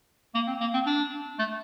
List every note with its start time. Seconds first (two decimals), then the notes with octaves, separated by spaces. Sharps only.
0.35 A#3
0.48 C4
0.61 A#3
0.74 C4
0.86 D4
1.39 A3